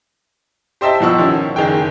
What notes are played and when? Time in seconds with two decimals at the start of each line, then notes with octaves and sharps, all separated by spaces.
0.81 G4 C5 D#5 E5 G5 A5
1.00 G1 B2 F3 F#5 C#6 E6
1.18 D#3 F3 C#4
1.56 F#1 D#3 G#4 G5